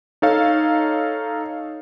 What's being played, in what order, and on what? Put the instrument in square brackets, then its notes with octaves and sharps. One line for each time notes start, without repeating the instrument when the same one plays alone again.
[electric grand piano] D#4 A4 C#5 F5